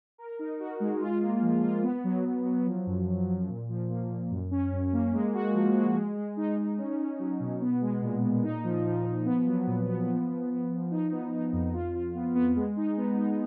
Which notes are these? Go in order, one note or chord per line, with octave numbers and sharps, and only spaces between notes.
A#4
D#4
F#4
G#3
F4
A#3
F3
F4
B3
F#3
F#3
F#3
F3
F#2
F#2
F3
A#2
F3
A#3
A#2
F#2
C#4
F#2
A#3
G#3
F#4
F3
G#3
G#3
G#3
D#4
D#4
C#4
C#4
F#3
B2
B3
G#3
A#2
A#2
D#4
F3
F3
F3
B3
F#3
A#2
B3
F3
F3
B3
F3
D#4
B3
D#4
F2
F4
F4
B3
B3
G#3
D#4
B3
D#4